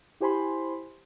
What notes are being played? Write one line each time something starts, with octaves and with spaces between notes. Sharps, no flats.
E4 G4 C5 G#5 B5 C6